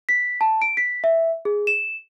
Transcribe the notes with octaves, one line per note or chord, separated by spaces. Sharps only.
B6
A5
D7
B6
E5
G#4
E7